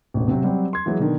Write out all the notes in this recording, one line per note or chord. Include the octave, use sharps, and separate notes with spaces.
E1 A1
C3 F#3 C4
F#3 G3 C4
C6 G#6
E3 F#3 G#3
B2 D3 D#3